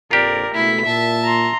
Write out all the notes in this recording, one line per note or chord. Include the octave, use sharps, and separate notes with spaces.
A#1 F2 F4 G4 A#4 D5
C#2 B2 A3 E4 B6
A#2 E5 A5
A#5 C6